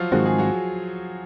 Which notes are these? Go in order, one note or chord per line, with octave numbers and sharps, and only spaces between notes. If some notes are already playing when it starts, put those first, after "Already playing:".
Already playing: F3 F#3 F4 F#4
G#2 D#3 G#3 C4 F#4
G#4
F#3 F#4